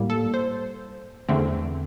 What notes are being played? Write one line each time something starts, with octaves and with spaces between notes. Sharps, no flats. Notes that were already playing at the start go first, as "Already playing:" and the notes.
Already playing: A2 G3 A#3
A4
C5
E2 D3 A3 C4